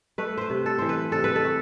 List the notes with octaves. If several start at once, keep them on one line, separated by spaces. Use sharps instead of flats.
A3 B4
B4 C5
C3
A4
E3 C5
B4
C3 A4
B4
A4
A3